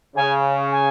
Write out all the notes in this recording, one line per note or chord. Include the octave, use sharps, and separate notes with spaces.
C#3 G#5
G#5